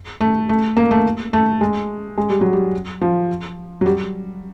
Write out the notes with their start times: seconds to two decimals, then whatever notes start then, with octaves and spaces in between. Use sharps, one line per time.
0.21 A3
0.49 A3
0.77 A#3
0.91 A3
1.33 A3
1.61 G#3
2.18 G#3
2.30 G3
2.41 F#3
2.53 G3
3.01 F3
3.81 F#3
3.86 G3